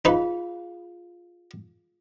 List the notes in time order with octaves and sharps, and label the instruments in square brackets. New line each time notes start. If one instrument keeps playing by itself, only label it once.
[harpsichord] D#4 B4 [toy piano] F4 G#4 F5